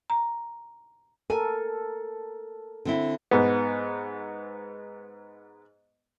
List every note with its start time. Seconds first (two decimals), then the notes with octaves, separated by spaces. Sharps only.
0.10 A#5
1.30 A4 A#4 G#5
2.85 D3 C4 E4
3.31 G#2 B3